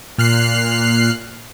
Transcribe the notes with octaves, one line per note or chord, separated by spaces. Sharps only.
A#2 F6 F#6 C7